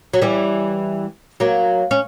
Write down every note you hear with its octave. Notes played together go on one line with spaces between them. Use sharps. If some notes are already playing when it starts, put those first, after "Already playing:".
F#3
E3 G3
F#3 A#3
C#4